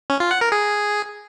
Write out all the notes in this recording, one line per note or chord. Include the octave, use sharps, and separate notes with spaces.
C#4
F4
F#5
A#4
G#4